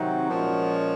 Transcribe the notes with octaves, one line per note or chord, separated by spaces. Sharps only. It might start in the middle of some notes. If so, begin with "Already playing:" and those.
Already playing: C3 D#3 F#3 C4 D#4 F#4
A#2 F3 G#3 C#4